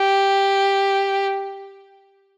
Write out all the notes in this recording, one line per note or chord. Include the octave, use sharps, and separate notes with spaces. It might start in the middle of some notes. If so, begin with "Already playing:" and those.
Already playing: G4